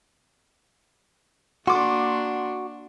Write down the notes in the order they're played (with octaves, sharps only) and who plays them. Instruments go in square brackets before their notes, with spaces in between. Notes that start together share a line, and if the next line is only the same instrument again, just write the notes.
[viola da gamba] A#3 D4 [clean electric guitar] F#4 [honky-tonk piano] C6 D6